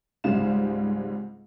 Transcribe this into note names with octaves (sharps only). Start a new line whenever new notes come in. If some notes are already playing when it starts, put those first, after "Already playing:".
C#2 G#2 G3 C4 F5 E7